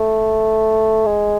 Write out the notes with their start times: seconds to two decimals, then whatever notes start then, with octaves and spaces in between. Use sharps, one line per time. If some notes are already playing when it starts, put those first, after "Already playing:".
Already playing: A3
1.06 G#3